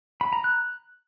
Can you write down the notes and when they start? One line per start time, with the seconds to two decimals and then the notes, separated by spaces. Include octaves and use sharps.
0.21 B5
0.33 A#5
0.44 F#6